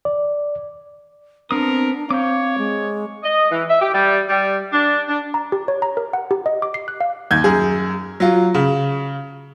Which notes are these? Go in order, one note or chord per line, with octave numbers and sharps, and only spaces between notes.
D5
B3 C4 D4 A#4 D#6
C4 C#5 F5 D6 G6
G#3
D#5
E3
E5
G4
G3
G3
D4
D4
A#5
G4
C#5
A#5
A#4
F#5
G4
D#5
D6
C7
F#6
F5
D#2 G6 G#6
F#2 G#4
F#3 F4
C#3